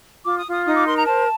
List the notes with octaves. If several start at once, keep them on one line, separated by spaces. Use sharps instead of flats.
F4 D6
D#6
F4
D#6
D#4 D#6
D6
A#4 C6
A#5
C5 A5